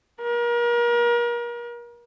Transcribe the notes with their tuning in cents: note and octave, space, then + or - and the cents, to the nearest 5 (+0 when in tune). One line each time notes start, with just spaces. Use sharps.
A#4 +35